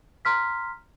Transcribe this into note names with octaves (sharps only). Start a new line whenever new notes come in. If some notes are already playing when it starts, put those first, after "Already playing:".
A#5 C6 F6 B6